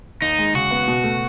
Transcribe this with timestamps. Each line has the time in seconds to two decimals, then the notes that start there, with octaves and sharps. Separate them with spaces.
0.21 D#2 D#4
0.38 G#3
0.55 C#3 F#4
0.71 B3
0.88 B2
1.04 A3